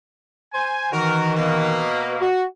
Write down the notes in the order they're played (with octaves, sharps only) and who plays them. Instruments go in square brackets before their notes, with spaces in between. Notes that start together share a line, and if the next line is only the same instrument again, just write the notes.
[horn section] C5 G#5
[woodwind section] D#3 E3 [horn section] F#4 A#4
[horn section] B2 A#3
[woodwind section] F#4